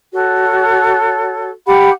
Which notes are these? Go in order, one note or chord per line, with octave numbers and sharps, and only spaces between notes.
F#4 A4 C#5
G4 F5 F#5 B5